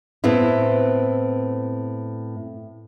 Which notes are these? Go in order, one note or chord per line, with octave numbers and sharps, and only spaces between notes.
A2 B3 C4 E4